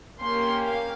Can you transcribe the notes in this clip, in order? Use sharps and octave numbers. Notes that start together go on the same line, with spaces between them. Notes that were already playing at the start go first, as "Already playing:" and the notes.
A#3 C#4 G4 C6
F5